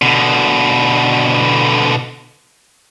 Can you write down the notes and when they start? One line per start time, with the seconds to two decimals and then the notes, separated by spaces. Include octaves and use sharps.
0.02 B2 D3